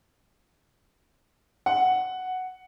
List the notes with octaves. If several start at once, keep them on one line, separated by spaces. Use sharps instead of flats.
F#5